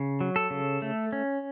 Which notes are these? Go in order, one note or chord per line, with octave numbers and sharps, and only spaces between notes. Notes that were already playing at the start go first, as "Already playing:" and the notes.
Already playing: C#3
F#3
A4
C#3
A3
C#4